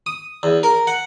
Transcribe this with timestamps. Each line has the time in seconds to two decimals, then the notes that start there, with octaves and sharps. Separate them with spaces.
0.06 D#6
0.43 E2
0.63 A#4
0.87 F#5